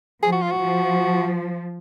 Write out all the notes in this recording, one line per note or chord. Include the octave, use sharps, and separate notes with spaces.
F3 G#4
F#4
F4
F#4
F3